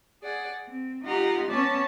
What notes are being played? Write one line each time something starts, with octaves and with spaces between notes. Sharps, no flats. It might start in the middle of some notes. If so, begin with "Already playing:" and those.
G#4 D5 F#5
C4
D#4 F4 G4 F#5 A#5 C6
B3 C#4 C#5 D5 A5